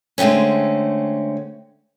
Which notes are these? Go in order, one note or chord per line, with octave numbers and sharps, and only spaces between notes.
D3 G#3 A3 C4 C#4